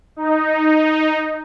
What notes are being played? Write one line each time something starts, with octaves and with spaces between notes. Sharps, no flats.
D#4